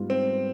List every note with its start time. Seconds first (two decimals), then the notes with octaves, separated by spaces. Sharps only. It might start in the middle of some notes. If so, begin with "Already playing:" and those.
Already playing: G#2 G3 B3 F4
0.10 C4